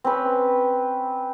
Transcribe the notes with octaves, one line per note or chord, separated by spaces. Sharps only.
C4 C#4 B4